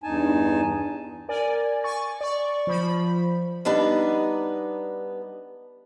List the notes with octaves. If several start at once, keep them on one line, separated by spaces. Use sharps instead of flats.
E2 G2 D#4 G#5 A5
A#4 D5 G#5
G#5 C#6 A6
D5 C#6
F3 B5
G3 B3 D4 D#4 B4